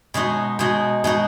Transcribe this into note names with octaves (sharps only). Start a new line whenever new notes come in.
B2 G#3 D#4 F#4
B2 G#3 D#4 F#4
B2 G#3 D#4 F#4